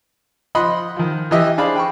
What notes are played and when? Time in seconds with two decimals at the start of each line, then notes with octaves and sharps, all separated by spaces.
0.55 F3 D#5 F#5 B5 C6 D#6
0.97 D#3 F3
1.31 E3 G4 D#5 E5
1.58 D4 G#4 C5 D5 F5 B5
1.76 G5 B5 C#6